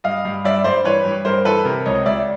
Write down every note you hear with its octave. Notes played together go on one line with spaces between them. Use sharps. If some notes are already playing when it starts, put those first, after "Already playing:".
G2 D#5 F5
G2
G2 D5 E5
G2 C5 D5
E3 B4 C#5
G2
G2 A#4 C5
E3 A4 B4
C3 A#4
C#2 C#5 D#5
C#2 D5 E5